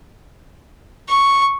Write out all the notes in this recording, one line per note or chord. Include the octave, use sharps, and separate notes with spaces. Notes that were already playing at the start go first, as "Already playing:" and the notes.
C#6